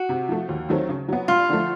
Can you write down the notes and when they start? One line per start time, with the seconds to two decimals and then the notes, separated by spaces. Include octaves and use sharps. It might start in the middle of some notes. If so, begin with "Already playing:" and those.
Already playing: F#4
0.09 C3
0.29 F3 A3
0.49 D#2
0.69 D#3 F#3 A3 C4
0.89 C#3
1.08 F#3 B3
1.28 G2 F4
1.49 D3 F3 A3